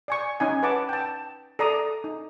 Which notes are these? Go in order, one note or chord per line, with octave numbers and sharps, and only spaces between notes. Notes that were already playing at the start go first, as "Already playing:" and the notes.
D5 G#5 C#6
C#4 D#4 G#5
B4 F#5 A5 D6
G5 A5
A4 D5 A#5 D#6
D#4